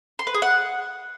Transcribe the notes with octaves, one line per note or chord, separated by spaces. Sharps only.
C6
B4
G#4
F#5